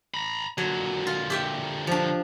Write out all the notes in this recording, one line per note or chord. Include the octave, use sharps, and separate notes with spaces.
A#5 B5
A#2 D3 F#3
F4
G4 E5 G5
F3 D4